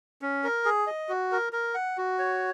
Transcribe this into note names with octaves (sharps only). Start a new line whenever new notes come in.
C#4
A#4
G#4
D#5
F#4
A#4
A#4
F#5
F#4
C#5